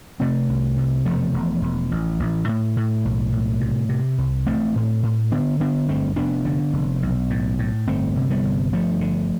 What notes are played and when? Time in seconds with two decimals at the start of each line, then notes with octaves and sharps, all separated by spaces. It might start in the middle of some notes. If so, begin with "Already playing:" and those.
0.20 C3 A3 C4
0.49 C2
0.77 C3
1.05 E1 F3 A3
1.33 E1
1.62 E1
1.91 A1
2.20 A1
2.48 A2
2.77 A2
3.05 B1
3.32 A2
3.61 C3
3.89 C3
4.18 C2
4.46 A1 A3 C4
4.76 A2
5.03 A2
5.31 D3 B3 D4
5.60 D3 B3 D4
5.88 G1 A3 C4
6.16 F1 B3 D4
6.45 D3
6.73 F1
7.02 B1
7.30 A2
7.59 A2
7.87 G1 A3 C4
8.16 C3
8.30 G3 B3
8.44 G1
8.73 G1 F3 A3
9.01 D3